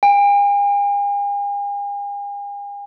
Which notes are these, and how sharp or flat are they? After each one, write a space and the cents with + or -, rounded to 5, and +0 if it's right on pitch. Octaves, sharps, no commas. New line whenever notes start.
G#5 -45